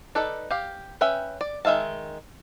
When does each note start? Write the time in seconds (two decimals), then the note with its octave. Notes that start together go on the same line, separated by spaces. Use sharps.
0.15 D#4 A4 B4 D5
0.51 G4 F5
1.01 C#4 B4 E5 G5
1.41 D5
1.65 D#3 G#3 E5 F5 A5